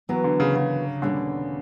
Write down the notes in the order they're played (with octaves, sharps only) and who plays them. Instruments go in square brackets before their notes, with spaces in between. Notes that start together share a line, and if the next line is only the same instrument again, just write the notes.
[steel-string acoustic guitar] E3 B3 F#4 A#4 [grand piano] F#3
[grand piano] D3
C#3
C#3
[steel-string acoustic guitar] E2 B2 G3 A#3 C#4 [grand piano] D3